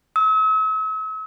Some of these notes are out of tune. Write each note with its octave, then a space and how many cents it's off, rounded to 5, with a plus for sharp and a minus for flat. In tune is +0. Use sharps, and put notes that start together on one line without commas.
E6 -45